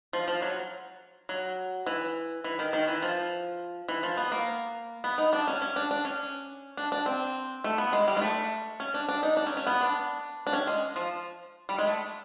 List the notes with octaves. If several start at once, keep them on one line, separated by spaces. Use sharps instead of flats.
F3
F3
F#3
F#3
E3
E3
D#3
D#3
E3
F3
E3
F3
B3
A#3
B3
D#4
D4
C#4
C#4
D4
D4
C#4
D4
D4
C4
A3
B3
G#3
G3
G#3
A3
C#4
D4
D4
D#4
D4
C#4
C#4
B3
D4
D4
C#4
G#3
F3
G3
G#3
A3